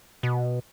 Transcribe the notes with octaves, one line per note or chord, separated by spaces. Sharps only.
B2